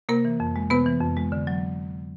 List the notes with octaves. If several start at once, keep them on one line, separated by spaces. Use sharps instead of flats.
C3 A#3 A#4
E3
F2
G#3
C3 B3 B4
E3
F2
G#3
D3
F#3